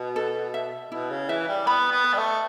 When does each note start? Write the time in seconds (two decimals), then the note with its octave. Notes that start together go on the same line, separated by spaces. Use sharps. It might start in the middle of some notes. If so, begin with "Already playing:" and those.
Already playing: B2 F#4
0.16 A4
0.54 E5
0.91 B2 E4
1.10 C#3
1.29 E3 E5
1.48 G3
1.66 B3 B5
1.92 B3
2.04 B4
2.13 G3
2.18 A3